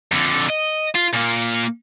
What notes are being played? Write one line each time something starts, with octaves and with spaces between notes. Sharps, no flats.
F2 D3
D#5
F4
A#2 A#3